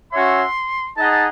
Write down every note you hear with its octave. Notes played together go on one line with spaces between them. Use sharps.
C#4 F#4 C#5 E5 C6
D#4 G#4 D#5 F#5 A5
A5